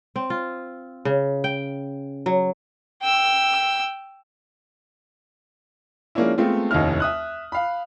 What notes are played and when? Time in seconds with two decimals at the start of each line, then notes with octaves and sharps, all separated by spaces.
0.16 C4
0.30 F4
1.05 C#3
1.44 G5
2.26 F#3
3.02 G5 E6
6.15 F3 G#3 A#3 C#4 D4 E4
6.38 G#3 A3 B3 C4 F4
6.71 F1 D#2 C#4 D#4 E4 F6
7.00 E5 D#6 F#6
7.52 F5 B5